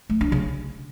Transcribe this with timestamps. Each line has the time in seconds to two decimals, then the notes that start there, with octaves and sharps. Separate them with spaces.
0.09 A3
0.21 D4
0.32 C#3